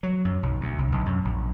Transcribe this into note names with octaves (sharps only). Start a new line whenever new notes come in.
F#3
F#2
B1
D2
C2
B1
F#2
A#1